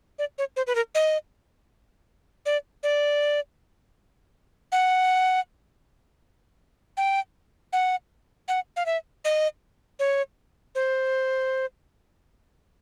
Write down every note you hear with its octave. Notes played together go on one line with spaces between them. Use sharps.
D5
C#5
C5
B4
A#4
D#5
D5
D5
F#5
G5
F#5
F#5
F5
E5
D#5
C#5
C5